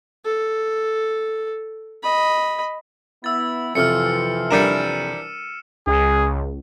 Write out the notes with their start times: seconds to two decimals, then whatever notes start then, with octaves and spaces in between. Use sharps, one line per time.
0.25 A4
2.03 D#5 B5
3.24 B3 E4 E6 A6
3.75 F2 C3 E3 F3 F6 C#7
4.51 G3 D4 A#4 C#7 D#7 E7
5.87 C#2 G#4